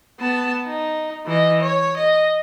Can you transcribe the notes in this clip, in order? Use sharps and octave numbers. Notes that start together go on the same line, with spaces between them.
B3 A5
D#4
E3 D#5
C#5
D#5